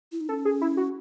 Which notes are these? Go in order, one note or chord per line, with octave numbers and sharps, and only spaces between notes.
E4
D#4
C#4 A4
G#4
E4
F#4